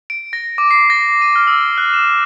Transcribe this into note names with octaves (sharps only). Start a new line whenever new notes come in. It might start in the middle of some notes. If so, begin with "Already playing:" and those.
D7
A#6
D6
C7
A#6
C7
D#7
F6
E6
F#6
E7